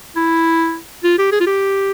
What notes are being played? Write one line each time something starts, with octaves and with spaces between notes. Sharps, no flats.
E4
F4
G4
G#4
F4
G4